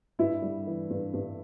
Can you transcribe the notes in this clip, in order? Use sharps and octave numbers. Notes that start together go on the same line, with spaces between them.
G2 E4
G3
E3
G2
G2